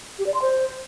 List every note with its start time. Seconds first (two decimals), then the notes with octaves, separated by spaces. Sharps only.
0.19 G4
0.27 D5
0.34 C6
0.42 C5